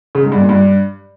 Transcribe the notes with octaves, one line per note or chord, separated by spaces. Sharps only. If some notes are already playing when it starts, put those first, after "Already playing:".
C#3
G#2
G2
A#2
G2